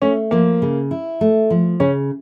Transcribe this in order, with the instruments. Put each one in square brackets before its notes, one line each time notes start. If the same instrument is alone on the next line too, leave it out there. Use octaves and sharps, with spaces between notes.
[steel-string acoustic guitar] A3 [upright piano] C#4
[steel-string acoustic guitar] F3 [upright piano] A#3
[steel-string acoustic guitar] C#3
E4
A3
F3
[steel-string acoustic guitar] C#3 [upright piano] C#4